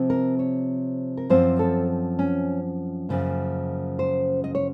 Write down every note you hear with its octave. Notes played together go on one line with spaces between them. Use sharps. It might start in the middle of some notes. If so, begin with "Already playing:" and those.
Already playing: C3 F3 C4
A#4
C#5
A#4
F#2 F3 C4 C5
A4
C#4
F#2 C#3 F3 A#3
C5
D#5
C#5